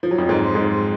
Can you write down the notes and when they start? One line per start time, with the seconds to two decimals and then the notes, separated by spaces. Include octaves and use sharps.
0.03 F3
0.11 F#3
0.18 F2 F3
0.29 G#2 G#3
0.54 G#2 G#3